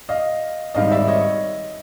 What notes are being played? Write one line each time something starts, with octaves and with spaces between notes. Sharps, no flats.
D#5 F5
G#1 G#2 D#3 G3 D#5 F5
D5 E5
C#5 D#5